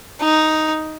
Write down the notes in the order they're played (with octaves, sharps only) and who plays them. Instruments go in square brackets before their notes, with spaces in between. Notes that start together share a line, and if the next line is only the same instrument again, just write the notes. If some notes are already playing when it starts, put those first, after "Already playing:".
[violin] D#4